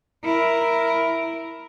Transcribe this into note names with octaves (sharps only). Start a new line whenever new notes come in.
E4 A#4